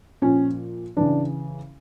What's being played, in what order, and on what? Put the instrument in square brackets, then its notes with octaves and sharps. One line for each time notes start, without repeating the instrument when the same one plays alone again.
[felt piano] A#2 F3 C#4
C#3 E3 D4